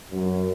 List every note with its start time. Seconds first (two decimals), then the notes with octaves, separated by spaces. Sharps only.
0.10 F#2